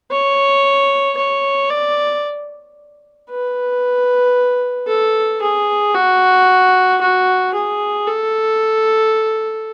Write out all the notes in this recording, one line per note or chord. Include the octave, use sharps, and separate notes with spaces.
C#5
C#5
D5
B4
A4
G#4
F#4
F#4
G#4
A4